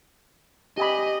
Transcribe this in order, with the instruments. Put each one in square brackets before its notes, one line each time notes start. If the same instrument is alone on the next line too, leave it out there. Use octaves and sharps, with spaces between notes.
[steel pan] G4 G#5 B5 [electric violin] D#5